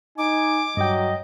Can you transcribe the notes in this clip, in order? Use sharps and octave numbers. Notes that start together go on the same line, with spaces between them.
D#4 G#5 D6
G2 F#3 D#5 G5